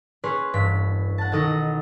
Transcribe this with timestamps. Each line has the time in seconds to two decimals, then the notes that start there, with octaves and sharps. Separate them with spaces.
0.24 C#4 G#4 B4 C#5 C6 F#6
0.53 E1 G2 B6
1.18 F#5 A5
1.32 B1 D#3 A4 F#5 D#6 A#6